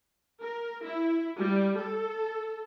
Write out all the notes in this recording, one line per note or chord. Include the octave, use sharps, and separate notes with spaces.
A#4
E4
G3
A4